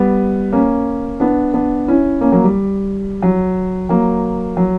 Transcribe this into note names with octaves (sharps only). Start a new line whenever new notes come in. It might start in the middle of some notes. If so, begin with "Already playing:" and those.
Already playing: G3 B3
A#3 C#4
B3 D4
B3 D4
C#4 E4
A#3 C#4
F#3 A#3
G3
F#3
F#3 A#3
F#3